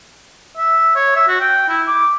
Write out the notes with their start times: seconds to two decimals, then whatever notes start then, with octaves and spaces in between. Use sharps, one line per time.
0.57 E5
0.96 C#5
1.16 E5
1.28 F#4
1.40 G5
1.69 E4
1.87 D6